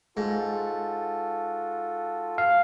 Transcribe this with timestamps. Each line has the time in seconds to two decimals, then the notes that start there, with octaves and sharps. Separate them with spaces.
0.17 G#2 F4 F#4 A4
2.38 F5